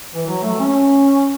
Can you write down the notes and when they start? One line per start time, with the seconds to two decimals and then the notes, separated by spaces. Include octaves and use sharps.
0.14 E3
0.27 F#3
0.42 A3
0.59 C#4